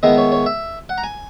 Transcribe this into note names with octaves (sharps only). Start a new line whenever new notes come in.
D#3 G#3 B3 E4 D#5
C#5
C#5
E5
F#5
A#5
G#5